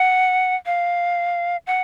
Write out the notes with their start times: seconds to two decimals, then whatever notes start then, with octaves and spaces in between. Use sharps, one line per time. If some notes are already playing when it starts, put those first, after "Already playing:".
Already playing: F#5
0.66 F5
1.67 F#5